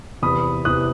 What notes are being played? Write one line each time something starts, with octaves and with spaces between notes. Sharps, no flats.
E2 C3 E3 B5 D#6
E2 C3 E3 D#6 F#6